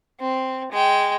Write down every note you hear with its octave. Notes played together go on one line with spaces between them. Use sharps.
C4
G#3 G5